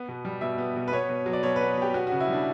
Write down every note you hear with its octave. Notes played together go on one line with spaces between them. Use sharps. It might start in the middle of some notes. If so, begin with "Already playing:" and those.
Already playing: B3
B2
G3
B2 E5
B3
B2
B4
B3 C#5
B2
F#3
D5
B2 C#5
B4
B3
B2 G4
B3 F#4
C#3 F#4
E4
G3
D4